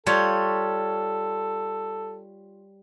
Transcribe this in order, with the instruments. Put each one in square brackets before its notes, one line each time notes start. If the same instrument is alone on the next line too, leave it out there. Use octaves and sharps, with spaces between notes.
[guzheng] G3 F4 C#5 [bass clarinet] A4